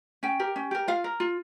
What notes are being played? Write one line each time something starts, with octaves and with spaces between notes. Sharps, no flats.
C#4 G5
G4 A#4
C#4
G4 A#4
F4 F5
A#4
F4